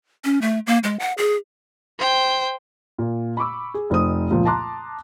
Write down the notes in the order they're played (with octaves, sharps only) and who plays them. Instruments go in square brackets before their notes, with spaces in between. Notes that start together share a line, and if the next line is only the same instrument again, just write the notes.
[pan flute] C#4
A3
A#3
G#3
F#5
G#4
[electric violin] C5 G5
[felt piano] A#2
B5 C#6 D6 E6
G#4
F1 D#4 C5 D#6
C#2 A#2 F3
A5 A#5 C6 D6 F#6